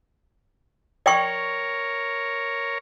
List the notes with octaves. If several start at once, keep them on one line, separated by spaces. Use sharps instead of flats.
A#4 C#5 D5 G5 C#6